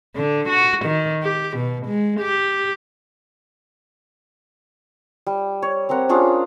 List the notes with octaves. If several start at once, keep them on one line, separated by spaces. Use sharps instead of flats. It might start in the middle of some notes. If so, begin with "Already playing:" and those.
D3
F#4
D#3
G4
B2
G#3
G4
G3
C#5
C4 G4 A#4 F#5
C#4 D4 F4 G#4